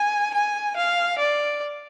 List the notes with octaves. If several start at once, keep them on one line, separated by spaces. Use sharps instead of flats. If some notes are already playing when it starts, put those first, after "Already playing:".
Already playing: G#5
G#5
F5
D5